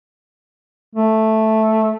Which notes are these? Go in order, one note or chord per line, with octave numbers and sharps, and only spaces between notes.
A3